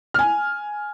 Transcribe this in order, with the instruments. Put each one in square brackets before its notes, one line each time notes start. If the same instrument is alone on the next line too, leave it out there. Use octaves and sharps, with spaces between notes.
[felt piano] G#5 F6